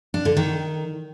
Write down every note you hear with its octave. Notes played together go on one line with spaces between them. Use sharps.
D4
D3
D#3